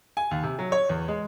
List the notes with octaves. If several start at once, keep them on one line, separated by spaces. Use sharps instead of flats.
G#5
D#2
C3
F#3
C#5
E2
G#3